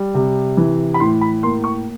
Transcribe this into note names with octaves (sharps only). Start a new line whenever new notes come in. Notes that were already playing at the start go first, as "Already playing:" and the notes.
Already playing: G3
C3
E3
B5
A2 C6
B5
A#3 C6
C#6